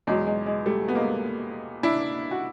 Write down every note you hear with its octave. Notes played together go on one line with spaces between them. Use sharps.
E2 B2 F#3 G#3
G#3
G#3
G3 A3
B3
G#3 A#3
D4 E4
F#4